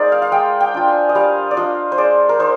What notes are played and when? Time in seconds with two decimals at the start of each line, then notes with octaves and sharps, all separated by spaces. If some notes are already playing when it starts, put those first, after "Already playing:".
Already playing: G#3 D#4 F4 A#4 C5 D5
0.12 F5
0.22 F5
0.32 G#3 G5
0.60 G5
0.74 D4 F4
0.88 G#5
1.09 D#5
1.15 G3 F5
1.51 D5
1.57 D4 F4 D#5
1.92 C5
1.98 G#3 D5
2.29 A#4
2.39 D#4 C5